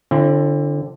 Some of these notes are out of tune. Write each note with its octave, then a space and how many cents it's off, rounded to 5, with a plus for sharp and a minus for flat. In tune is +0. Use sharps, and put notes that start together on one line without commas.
D3 +0 C4 +35 E4 +45